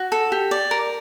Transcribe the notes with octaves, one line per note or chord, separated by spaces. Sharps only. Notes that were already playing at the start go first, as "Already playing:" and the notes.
Already playing: F#4
A4
G4
D5
A#4